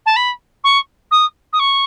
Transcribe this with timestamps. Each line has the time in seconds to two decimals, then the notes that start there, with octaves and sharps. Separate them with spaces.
0.06 A5
0.16 B5
0.64 C#6
1.11 D#6
1.53 D#6
1.59 C#6